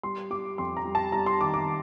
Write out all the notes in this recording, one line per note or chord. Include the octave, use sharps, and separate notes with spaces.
G3 C6
G3 D6
F2 C6
A#5
G3
A5
G3 A#5
C6
D#3 D6
D6